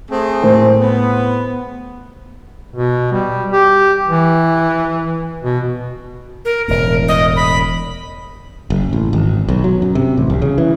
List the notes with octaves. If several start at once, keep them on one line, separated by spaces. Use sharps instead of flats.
A3 C4 G#4
A2 A#4 C5
B3
B2
G3
G4
E3
B2
A#4
E1 A2 A#4
D#5
B5
F#1
A1
G#1
B1
F#3
F#2
C3
A1
C2
C#3
E3